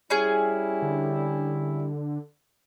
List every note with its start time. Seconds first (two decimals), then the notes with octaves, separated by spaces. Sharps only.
0.10 G3 C#4 E4 G#4
0.82 D3